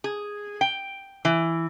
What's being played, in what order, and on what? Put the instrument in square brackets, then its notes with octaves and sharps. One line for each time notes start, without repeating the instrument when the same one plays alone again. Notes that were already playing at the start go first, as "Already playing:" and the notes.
[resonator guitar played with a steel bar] G#4
G5
E3